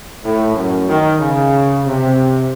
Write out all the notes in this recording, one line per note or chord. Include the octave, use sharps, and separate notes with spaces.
A2
F#2
D#3
C#3
C3